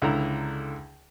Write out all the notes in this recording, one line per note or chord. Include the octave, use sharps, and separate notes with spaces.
C#2 D3 E4 A#5